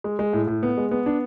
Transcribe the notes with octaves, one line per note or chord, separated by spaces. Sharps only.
G#3
G#3
A2
A2
B3
G#3
B3
D4